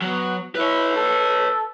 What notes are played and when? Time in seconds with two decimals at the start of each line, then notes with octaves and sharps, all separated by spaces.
0.02 F#3 B3
0.55 E4 B4 C#5
0.96 A4